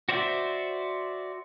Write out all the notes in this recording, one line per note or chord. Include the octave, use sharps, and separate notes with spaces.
F#4 C5 D5 E5